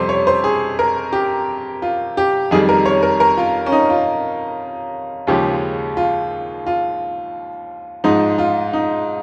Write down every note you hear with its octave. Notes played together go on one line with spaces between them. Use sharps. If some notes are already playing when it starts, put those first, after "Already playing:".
Already playing: F2 C3 G3 C5
C#5
C5
G#4
A#4
G4
F4
G4
F2 D#3 G3 G#4
A#4
C#5
A#4
A#4
F4
C#4
D#4
F4
D#2 C#3 F3 G#3 G4
F4
F4
G#2 F3 G#3 D#4
F4
D#4